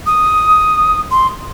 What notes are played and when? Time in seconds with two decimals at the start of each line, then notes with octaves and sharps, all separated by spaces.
0.06 D#6
1.11 C6